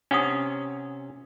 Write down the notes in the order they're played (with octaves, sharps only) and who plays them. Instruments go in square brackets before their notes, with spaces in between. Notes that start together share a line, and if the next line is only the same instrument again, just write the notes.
[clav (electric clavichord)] C3 C#4 [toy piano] D4 F#5 D#6